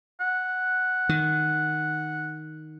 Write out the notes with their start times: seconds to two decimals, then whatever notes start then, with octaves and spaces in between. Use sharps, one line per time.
0.20 F#5
1.09 D#3